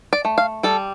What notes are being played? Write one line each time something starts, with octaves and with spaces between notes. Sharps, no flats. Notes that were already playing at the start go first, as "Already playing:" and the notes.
D5
A3
F5
G3 A4